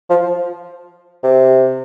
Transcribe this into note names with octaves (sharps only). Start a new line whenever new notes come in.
F3
C3